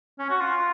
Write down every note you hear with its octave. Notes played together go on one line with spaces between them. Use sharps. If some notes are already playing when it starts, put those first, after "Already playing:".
C#4
F#4
F4